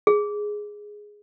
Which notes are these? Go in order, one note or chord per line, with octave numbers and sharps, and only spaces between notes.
G#4